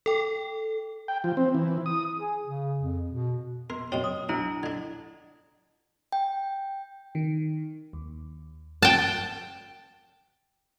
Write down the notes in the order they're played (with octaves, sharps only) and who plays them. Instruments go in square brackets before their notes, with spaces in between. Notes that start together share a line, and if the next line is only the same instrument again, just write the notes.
[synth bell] A4 G5
[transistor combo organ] G5
F3
C4
E3
D#6
[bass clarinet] G#4
C#3
F2
B2
[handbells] B3 [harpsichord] A#4
[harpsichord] F#2 B2 C4 [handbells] C#5
[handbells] D#6
[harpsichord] B1 [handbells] D4 E4 A#5
[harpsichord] D3 D4 [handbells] G#6
[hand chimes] G5
[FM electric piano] D#3
D#2
[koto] G5 A5